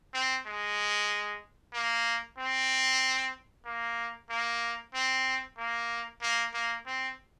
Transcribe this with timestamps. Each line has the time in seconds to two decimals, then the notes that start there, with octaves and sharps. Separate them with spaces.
0.14 C4
0.46 G#3
1.73 A#3
2.38 C4
3.66 A#3
4.30 A#3
4.94 C4
5.58 A#3
6.22 A#3
6.53 A#3
6.86 C4